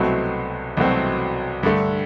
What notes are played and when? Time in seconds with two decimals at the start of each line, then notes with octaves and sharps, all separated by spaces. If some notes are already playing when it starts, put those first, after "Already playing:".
Already playing: C2 B2 F#3 A3 C4
0.77 C2 B2 F#3 A3 C4
1.63 G2 D3 A3